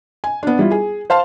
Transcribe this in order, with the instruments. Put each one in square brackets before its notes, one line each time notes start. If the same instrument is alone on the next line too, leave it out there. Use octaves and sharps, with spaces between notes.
[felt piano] G#5
B3 D4
G3 E4 F4
G#4
C5 F5 A5 C6